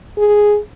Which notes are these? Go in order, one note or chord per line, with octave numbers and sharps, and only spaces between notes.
G#4